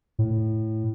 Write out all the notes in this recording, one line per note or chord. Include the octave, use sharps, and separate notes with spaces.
A2